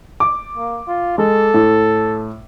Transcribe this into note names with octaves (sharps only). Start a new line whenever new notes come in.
D6
A#3
F4
G#3 A4
A2